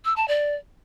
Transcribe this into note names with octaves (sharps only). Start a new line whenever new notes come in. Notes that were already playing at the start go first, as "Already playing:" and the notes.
E6
A5
D5